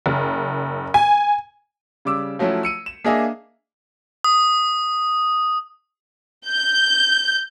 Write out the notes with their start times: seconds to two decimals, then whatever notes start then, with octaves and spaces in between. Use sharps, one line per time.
0.06 F#1
0.94 G#5
2.05 C#3 G3 D6 E6
2.39 F3 F#3 A3 C#4 E4 F4
2.63 E6 C#7 D#7
2.86 E7
3.05 A#3 D4 G#4 D#5 E5 G#5
4.24 D#6
6.47 G6